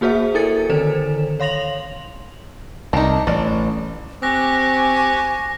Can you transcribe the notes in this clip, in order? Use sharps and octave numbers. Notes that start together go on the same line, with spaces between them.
A#3 F#4 G#4 C5 E5
E4 A4 A#4 A6 C#7
D3 D#3 A4 C5 E7
C#5 F5 C6 A#6 F7 F#7
C2 D4 D#4
A1 D5
C4 G4 G#5 C#6 D6 F#6 A#6